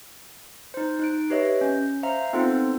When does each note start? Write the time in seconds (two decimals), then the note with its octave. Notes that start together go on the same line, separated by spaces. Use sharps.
0.74 D#4 C5
0.99 D#4 F#6 D7
1.30 G4 B4 C#5 D#5 E5
1.61 C#4
2.03 C5 E5 F5 A#5
2.33 B3 C4 D#4 F4 A4 C5